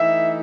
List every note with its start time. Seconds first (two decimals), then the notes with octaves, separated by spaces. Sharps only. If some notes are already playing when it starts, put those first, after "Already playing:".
Already playing: E3 A3 D#4 E5